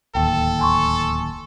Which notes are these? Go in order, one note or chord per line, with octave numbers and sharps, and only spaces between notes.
D1 D#2 A4 G5
G#5 C6 C#6